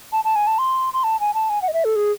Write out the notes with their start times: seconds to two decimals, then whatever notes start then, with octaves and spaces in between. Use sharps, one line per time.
0.13 A5
0.25 A5
0.36 G#5
0.47 A5
0.58 C6
0.93 C6
1.04 A5
1.20 G#5
1.34 A5
1.50 G#5
1.62 F#5
1.68 D#5
1.74 E5
1.85 A4
1.96 G#4